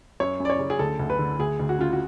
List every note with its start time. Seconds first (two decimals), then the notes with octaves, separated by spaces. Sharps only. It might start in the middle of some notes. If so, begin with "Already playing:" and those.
0.20 F#2 C#5
0.40 F#2
0.45 D5
0.50 C#5
0.59 C#3
0.70 G#4
0.79 D2 A4
0.99 D2
1.10 B4
1.19 D3
1.39 D2 G#4
1.60 D2
1.69 F#4
1.79 C#3 F4
1.93 F#4